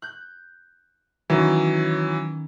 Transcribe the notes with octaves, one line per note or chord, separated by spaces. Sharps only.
F#6 G6
D#3 E3 F#3 C#4